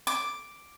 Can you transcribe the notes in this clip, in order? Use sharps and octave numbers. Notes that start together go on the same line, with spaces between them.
D6